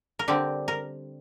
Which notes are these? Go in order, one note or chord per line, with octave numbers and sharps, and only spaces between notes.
A#4
D3 G3 C4 G4
A#4